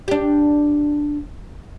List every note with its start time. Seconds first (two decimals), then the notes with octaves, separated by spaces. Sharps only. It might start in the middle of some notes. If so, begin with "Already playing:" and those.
0.08 D4 G4